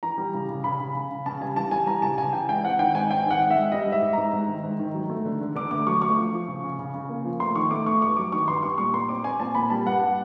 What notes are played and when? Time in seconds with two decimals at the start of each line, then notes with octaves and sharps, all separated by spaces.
0.03 E3 A#5
0.18 G3
0.34 C#3
0.49 C#3
0.64 C#3 B5
0.80 C#3
0.95 C#3
1.11 C#3
1.26 C#3 A5
1.41 G3 G#5
1.56 E3 A5
1.71 G3 G#5
1.87 G3 A#5
2.02 C#3 A5
2.18 C#3 G#5
2.33 E3 G5
2.49 G#3 G5
2.63 C4 F#5
2.79 D#3 G5
2.94 G#2 G#5
3.10 C4 G5
3.26 D#3 F#5
3.40 G#3
3.50 E5
3.56 G#3
3.72 G3 D#5
3.87 G#2
3.92 E5
4.02 G#2
4.13 G#2 A#5
4.33 G#2
4.48 D#3
4.63 G#2
4.79 D#3
4.95 F#3
5.10 A3
5.25 D3
5.41 D3
5.55 D3 D6
5.71 A3 D6
5.87 F#3 C#6
6.02 A3 C#6
6.17 F3
6.32 F3
6.48 C#3
6.64 C#3
6.79 C#3
6.94 C#3
7.09 A#3
7.25 F3
7.40 A3 C6
7.56 D#3 C#6
7.71 A3 D6
7.86 A3 C#6
8.02 G2 C#6
8.17 F#3 D6
8.32 D#3 C#6
8.48 G2 C6
8.63 G3 C#6
8.78 A#2 C#6
8.93 A#2 C6
9.09 C4 D6
9.24 C4 G#5
9.40 A#2 A5
9.55 A#2 B5
9.70 G3 A5
9.86 G2 F#5
10.01 G3